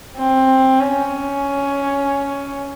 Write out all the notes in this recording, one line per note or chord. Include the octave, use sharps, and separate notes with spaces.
C4
C#4